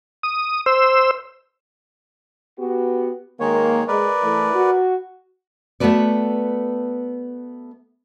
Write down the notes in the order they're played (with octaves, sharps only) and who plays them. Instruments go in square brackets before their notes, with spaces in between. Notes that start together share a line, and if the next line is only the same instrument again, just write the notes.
[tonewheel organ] D#6
C5 E6
[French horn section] B3 F#4 G4
[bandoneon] D#3 G#3 C#5 [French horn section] A#3
[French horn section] G#3 [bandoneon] A#4 B4 D5
[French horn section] E3 A3
F#4
[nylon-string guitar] A3 B3 F#4 A4 B4 D5